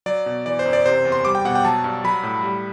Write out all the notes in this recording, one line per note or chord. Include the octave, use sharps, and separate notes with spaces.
F#3 D5
B2
E3 D5
C5
F#2
D5
C3 C5
E2
C6
G3 D6
G5
B2 F#5
G5
F#3 A5
G2
F#3 B5
A2
G3